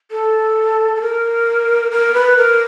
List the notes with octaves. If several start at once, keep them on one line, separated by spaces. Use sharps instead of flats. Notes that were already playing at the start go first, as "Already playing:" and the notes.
A4
A4
A#4
A#4
B4
A#4